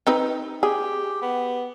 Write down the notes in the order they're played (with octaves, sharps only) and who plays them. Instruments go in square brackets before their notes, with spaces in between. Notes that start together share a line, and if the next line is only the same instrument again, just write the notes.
[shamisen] C4 D#4 B4
[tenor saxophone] G4 [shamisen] G#4
[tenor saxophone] B3